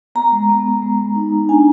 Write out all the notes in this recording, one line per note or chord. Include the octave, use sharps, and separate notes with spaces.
B3 A#5
G#3
B3
B3
G#3
G#3
D#4
D#4
D4 G#5